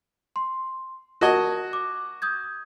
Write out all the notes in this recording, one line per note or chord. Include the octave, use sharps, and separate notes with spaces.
C6
F#4 A#4 D#5 A5 G#6
D6
D#6 G6 G#6